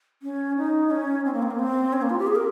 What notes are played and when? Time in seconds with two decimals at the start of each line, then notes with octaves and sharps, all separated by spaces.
0.22 C#4
0.58 D#4
0.91 C#4
1.25 C4
1.34 A#3
1.42 C4
1.51 A#3
1.59 C4
1.93 C#4
2.02 A#3
2.10 F4
2.19 G4
2.27 G#4
2.35 A#4